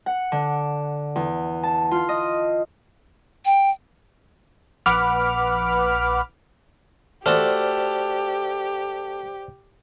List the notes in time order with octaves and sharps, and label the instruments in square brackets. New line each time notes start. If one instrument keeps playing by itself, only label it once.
[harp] F#5
D3
E2
A5
F4
D#5
[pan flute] G5
[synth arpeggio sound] A#1 B4 F#5 B5 D6 F6
[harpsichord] A3 F#4 A4 [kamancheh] G4 [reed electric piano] C5 D5 F6